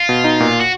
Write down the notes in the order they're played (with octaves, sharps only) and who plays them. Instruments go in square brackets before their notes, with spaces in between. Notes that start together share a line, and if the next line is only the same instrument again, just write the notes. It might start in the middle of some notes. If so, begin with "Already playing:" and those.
Already playing: [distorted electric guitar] F4
[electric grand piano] B2
D#4
A#2
[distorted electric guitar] F#4